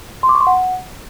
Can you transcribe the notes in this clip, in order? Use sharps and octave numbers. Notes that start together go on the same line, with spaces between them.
C6
D6
C#6
C6
F#5